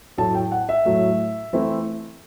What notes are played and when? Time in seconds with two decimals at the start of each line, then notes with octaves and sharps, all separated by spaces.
0.18 A2 F#3 A3 A5
0.35 G5
0.52 F#5
0.69 E5
0.85 A2 F#3 A3
1.53 E3 A3 C4 E4